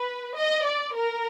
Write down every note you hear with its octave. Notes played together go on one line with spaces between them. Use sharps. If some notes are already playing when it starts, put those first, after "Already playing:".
Already playing: B4
D#5
D5
A#4